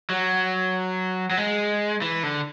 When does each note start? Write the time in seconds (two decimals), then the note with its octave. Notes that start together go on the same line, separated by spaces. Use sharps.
0.10 F#3
1.31 F#3
1.38 G#3
2.02 E3
2.23 D3